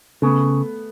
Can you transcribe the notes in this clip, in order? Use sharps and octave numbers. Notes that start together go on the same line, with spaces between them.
C#3 A3 B3